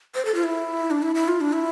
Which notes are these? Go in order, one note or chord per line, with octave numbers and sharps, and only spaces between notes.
C5
A4
F4
E4
D4
E4
E4
F4
D4
E4